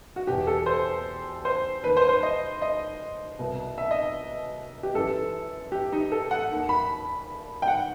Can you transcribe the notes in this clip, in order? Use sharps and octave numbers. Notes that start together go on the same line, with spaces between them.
F#4
E2 B2 G4
A4
C5
C5
D#2 D#3 B4
C5
C5
D#5
D#5
C2 B2
E5
D#5
G4
F#2 E3 A4
G4
D#4
A4
F#5
D#2 D#3
B5
G5
F#5